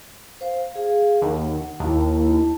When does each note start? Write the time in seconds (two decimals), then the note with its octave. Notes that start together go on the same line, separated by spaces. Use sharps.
0.41 C5 F5
0.74 G#4 F5
1.22 D#2 F#5
1.80 D#2 E4 A5